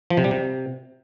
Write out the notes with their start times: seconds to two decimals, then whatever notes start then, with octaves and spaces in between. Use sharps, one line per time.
0.10 F3
0.17 C3
0.24 G3
0.31 C3